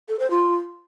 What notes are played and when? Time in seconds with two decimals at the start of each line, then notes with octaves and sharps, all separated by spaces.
0.09 A4
0.20 C5
0.31 F4